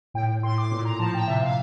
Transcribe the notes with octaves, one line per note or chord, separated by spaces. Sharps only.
A2 G5
A2 C6
D6
A#2 C6
A#5
F3 A5
G5
C3 E5
F5